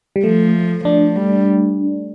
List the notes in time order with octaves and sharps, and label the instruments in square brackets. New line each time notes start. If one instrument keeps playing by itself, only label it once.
[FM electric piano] G3
[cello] F3 [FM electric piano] A3
[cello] F3 [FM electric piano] D4
[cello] G3